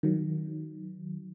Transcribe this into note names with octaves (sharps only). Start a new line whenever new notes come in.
D#3 F#3